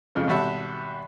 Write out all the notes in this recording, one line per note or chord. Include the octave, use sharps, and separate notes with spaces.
F2 C#3 F3 G#3
G#1 B2 G3 F#4 E5 A5